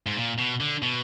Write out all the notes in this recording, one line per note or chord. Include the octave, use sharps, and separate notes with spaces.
G#2
A#2
B2
D3
B2